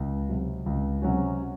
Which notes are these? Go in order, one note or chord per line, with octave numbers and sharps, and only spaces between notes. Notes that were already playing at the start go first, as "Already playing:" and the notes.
Already playing: C#2
C3 F#3
C#2
C3 F#3 C#4 F#4